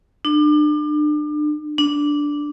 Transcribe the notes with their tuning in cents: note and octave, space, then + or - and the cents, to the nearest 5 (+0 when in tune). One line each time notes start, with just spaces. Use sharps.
D4 +35
D4 -5